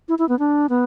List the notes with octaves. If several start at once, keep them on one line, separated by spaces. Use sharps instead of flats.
E4
E4
B3
D4
B3